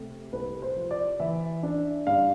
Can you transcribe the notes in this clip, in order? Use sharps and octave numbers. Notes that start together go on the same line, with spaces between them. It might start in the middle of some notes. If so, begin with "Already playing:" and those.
Already playing: C3 A3
C2 B4
C5
F3
D5
E3 E5
D4
G2 F5